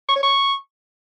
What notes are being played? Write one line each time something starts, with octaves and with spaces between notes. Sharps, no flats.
C#6
C#5
C#6